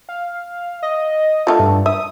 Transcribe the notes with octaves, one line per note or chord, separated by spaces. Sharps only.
F5
D#5
D3 A3 D#4 F4
G2
E5 D#6